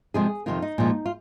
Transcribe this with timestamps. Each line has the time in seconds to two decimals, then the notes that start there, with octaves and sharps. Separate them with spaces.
0.14 C3 F3 G#3 C4 G#4
0.46 F2 C3 D#3 F4
0.62 D#4
0.78 A#2 F3 G#3
1.06 F4